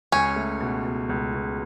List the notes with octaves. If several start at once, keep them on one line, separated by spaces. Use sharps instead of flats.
C#2 C#4
A3
B2
B2
C#2
B2